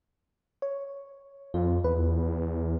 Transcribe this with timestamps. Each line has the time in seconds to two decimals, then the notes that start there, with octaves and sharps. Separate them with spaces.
0.62 C#5
1.54 F2 F4
1.84 E2 B4